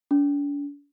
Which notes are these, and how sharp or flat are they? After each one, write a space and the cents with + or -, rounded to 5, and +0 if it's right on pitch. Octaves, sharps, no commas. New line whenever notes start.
D4 -45